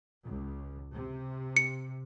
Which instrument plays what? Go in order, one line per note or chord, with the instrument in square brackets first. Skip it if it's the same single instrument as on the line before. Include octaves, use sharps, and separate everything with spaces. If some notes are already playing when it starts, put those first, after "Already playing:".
[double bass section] C#2
C3
[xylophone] C#7